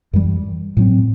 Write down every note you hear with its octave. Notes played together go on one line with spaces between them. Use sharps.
F#2 E3 G3
A2 F#3 C4